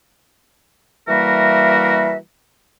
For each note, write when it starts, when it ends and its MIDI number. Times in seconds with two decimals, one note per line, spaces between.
1.08 2.17 52
1.08 2.17 55
1.08 2.17 58
1.08 2.17 66
1.08 2.17 70
1.08 2.17 76